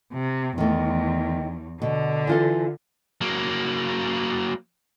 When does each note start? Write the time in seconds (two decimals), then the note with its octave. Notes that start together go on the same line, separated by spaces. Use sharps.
0.13 C3
0.58 E2 D#3 A3
1.82 B2 D3
2.27 E3 F4 A4
3.21 F#3 A#3